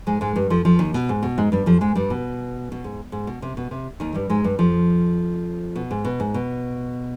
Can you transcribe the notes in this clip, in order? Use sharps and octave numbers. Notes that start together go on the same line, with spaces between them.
G#2 G#3
G#2 G#3
G2 G3
F2 F3
F2 F3
D#2 D#3
B2
G#2
B2
G#2 G#3
G2 G3
F2 F3
G#2 G#3
G2 G3
B2
B2
G#2
G#2
B2
C3
B2
C3
D#2 D#3
G2 G3
G#2 G#3
G2 G3
F2 F3
B2
G#2
B2
G#2
B2